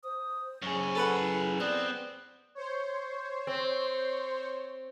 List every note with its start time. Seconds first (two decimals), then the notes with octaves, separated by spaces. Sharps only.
0.04 C5 D#6
0.62 F#2 G#4 C#5
0.95 A4 B4 F#5
1.20 E4
1.60 B3 C4 D5
2.55 C5 C#5
3.47 C4